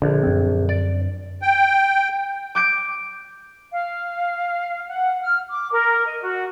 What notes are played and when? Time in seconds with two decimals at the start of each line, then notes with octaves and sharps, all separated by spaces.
0.02 A#1 D3
0.23 F#2 C4
0.69 D5
1.42 G5
2.55 D6 G6 D7
3.72 F5
4.88 F#5
5.23 F6
5.49 D6
5.71 A#4
6.07 D#5
6.24 F#4